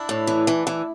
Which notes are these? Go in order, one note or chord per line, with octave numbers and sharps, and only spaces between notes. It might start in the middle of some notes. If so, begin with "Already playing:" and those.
Already playing: D4 E4
A2
E3
E3
E3